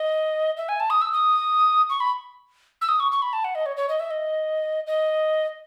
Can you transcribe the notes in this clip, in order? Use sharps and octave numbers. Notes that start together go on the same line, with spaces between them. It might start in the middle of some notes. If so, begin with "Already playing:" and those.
Already playing: D#5
E5
G#5
A5
D#6
E6
D#6
C#6
B5
E6
D#6
C#6
C#6
B5
A5
F#5
D#5
C#5
C#5
D#5
E5
D#5
D#5